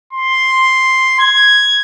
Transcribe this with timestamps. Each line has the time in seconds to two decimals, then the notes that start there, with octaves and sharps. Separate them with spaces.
0.13 C6
1.20 G#6